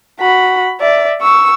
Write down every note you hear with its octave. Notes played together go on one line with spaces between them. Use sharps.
F#4 B5
D5 E5
C#6 E6